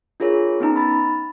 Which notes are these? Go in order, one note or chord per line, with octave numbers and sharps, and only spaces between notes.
D4 F4 G#4 A#4 C#5
B3 C#4 D#4 A#5
B5 A6